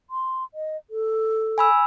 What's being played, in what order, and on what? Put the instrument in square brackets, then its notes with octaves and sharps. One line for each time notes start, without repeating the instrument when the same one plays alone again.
[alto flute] C6
D#5
A4
[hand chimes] G#5 B5 E6